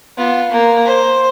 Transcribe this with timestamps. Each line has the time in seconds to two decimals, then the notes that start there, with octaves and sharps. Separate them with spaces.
0.18 B3 F4
0.51 A#3
0.85 C5